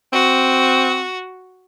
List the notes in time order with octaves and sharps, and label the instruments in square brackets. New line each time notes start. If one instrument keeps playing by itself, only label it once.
[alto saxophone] C4 [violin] F#4